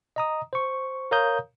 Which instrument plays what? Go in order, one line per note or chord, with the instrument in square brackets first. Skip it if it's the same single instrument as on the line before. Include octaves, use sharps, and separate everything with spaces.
[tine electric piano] D#5 A#5 D#6
C5 C#6
A#4 C#5 F5 A#5 D#6 G6